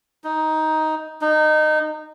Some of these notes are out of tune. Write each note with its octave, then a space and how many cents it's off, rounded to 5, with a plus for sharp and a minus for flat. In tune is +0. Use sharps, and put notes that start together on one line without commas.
D#4 +10
D#4 -20